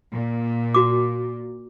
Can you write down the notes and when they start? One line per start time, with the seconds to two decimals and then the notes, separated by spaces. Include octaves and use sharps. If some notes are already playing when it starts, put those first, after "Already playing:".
0.12 A#2
0.74 F#4 D6